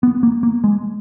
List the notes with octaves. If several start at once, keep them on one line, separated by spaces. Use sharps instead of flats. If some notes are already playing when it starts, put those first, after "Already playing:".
B3
A#3
A#3
G#3